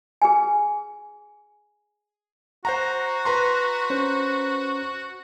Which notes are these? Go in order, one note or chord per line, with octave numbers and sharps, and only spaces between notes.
G#4 B4 G#5
F#4 C5 F#5 A#5
B4 A#5 C6
C#4 C5